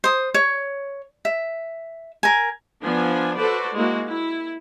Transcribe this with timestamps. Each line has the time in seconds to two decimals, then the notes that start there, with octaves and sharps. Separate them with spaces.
0.04 C5 D#6
0.34 C#5
1.25 E5
2.23 A#4 G#5
2.82 F3 B3 D4 G#5
3.38 F#4 A4 B4 C5 D5
3.75 G#3 A#3 E4 F#4
4.06 E4